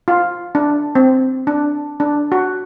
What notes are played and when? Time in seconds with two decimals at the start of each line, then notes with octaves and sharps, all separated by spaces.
0.08 F4
0.55 D4
0.95 C4
1.47 D4
2.00 D4
2.32 F#4